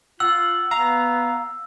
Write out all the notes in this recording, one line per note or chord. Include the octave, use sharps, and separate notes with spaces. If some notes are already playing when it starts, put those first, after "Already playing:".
F4 F#5 E6
B3 F5 A#5